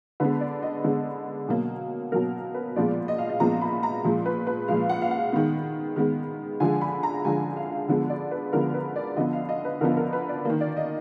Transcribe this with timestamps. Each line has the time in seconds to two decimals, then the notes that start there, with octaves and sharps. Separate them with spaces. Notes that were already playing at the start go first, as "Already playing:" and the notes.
0.20 D3 G#3 B3 B4
0.41 D5
0.62 D#5
0.84 D3 G#3 B3
1.48 B2 F#3 A#3
2.12 B2 F#3 A#3 A#4
2.54 B4
2.76 A#2 F3 G#3 B3 D5
3.08 D#5
3.18 F5
3.29 D#5
3.40 A#2 F3 G#3 B3 A#5
3.61 B5
3.83 A#5
4.04 A#2 F3 G#3
4.26 B4
4.47 B4
4.68 A#2 F3 G#3 F5
4.89 F#5
5.02 F5
5.11 F#5
5.33 D#3 G#3 B3
5.96 D#3 G#3 B3
6.60 D3 F3 G#3 G#5
6.81 B5
7.03 A#5
7.25 D3 F3 G#3 G#5
7.57 F5
7.88 D3 F3 G#3 B3
8.10 D5
8.31 B4
8.53 D3 F3 G#3 B3 A#4
8.74 B4
8.96 D5
9.16 D3 F3 B3 D#5
9.33 F5
9.49 D#5
9.65 B4
9.81 D3 F3 B3 A#4
9.97 A#4
10.13 B4
10.29 D5
10.45 D#3 A#3
10.61 D5
10.77 D#5